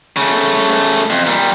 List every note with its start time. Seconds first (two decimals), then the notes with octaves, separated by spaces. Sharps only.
0.17 C#3 A3
1.10 F2
1.26 A#2 G3